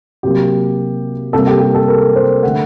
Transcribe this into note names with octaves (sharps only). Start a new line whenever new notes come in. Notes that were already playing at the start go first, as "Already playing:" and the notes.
C3 F#3 A#3 G4
C3 G3 A#3 A4
G4
G4
A4
A#4
C5
D3 A3 F#5